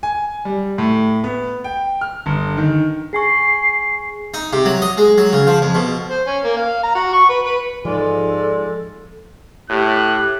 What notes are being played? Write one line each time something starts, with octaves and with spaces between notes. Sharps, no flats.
G#5
G3
A2
B3
G5
F6
G1
D#3
G#4 G#5 C#6 C7
D#4
C3
F#3
D#5
G#3
F#3
C#3
F3
F2
B2
C5
C#4
A#3
F5
A#5
F#4
C#6
B4
B4
G#2 F3 G#3 F4 A4 D5
A2 G4 F#6